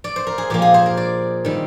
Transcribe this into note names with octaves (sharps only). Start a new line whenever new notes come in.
D5
C5
A#4
G#4
A#2 F3 A#3 G4
G#4
C5
A#4
D5
D#3 G3 C4